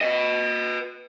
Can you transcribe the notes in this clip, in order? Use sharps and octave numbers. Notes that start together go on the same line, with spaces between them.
B4 D#5